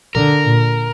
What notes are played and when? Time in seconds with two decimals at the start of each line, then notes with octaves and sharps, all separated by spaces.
0.15 D3 A#4
0.45 A#2